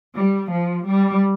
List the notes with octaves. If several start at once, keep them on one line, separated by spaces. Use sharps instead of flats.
G3
F3
G3